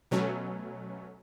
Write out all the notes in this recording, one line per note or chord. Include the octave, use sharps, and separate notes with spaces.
B2 F#3 A3 C#4